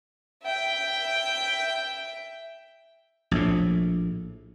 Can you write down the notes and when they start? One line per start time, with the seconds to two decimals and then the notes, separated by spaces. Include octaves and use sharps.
0.43 E5 G5
3.31 A#1 A2